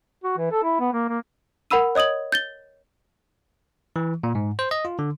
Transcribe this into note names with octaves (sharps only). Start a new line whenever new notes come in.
F#4
E3
A4
E4
B3
A#3
A#3
A#4 F#5 B5 E6 D#7
C#5 D#5 D#6 G#6 F#7
G6 A6 G7
E3
A#2
G#2
C5
D#5
F4
D3